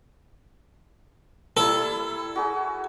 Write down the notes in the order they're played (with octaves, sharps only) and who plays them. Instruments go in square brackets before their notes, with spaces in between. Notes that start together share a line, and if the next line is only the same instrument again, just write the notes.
[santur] G3 A#3 E4 [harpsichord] A4
[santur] F#4 G#4 A#5